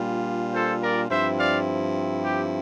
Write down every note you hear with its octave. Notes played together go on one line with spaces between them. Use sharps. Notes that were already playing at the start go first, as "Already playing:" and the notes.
Already playing: A#2 G3 D4 F4
A4 C5
A#4 D5
G2 F3 C4 E4 C5 E5
D5 F5
G4